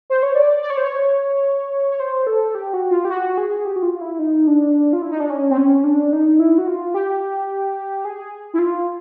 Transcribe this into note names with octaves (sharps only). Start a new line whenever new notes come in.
C5
C#5
D5
D5
C#5
C5
C#5
C#5
C5
A4
G4
F#4
F4
G4
F#4
G#4
G4
F#4
F4
E4
D#4
D4
F4
E4
D#4
D4
C#4
C4
C#4
D4
D#4
E4
F#4
F4
G4
G#4
E4
F4